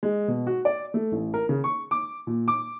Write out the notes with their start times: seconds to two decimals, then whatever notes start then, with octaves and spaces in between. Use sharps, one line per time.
0.03 G#3
0.28 B2
0.47 F#4
0.65 D5
0.94 A3
1.12 A1
1.34 A#4
1.49 C#3
1.64 C#6
1.91 D6
2.27 A#2
2.48 D6